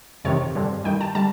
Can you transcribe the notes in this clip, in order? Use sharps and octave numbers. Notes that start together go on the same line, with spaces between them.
F2 C3 D#3 C#5
G2 D3 G3 C4
G2 D#3 G3 G5
A5
D3 G3 A5